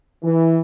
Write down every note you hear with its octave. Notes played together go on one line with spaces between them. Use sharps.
E3